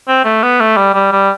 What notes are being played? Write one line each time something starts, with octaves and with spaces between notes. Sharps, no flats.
C4
A3
B3
A3
G3
G3
G3